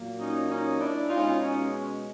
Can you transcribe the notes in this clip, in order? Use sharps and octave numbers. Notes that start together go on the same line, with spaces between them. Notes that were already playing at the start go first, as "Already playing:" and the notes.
Already playing: A#2 F#3 A#3
C#4 D#4
C#4 D#4
D4 E4
B2 G#3 C#4 D#4 F4
C#4 D#4
C#4